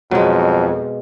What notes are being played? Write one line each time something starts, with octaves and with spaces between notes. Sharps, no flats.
F2 B2 F#3 G#3